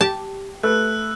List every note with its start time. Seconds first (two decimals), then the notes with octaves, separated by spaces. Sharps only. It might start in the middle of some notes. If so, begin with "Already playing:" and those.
0.01 G4 A5
0.63 A3 A4 B4 E6 F#6